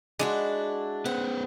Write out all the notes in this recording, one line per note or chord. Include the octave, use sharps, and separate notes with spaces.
G#3 D4 E4 F#4
B3 B4 C5 F#5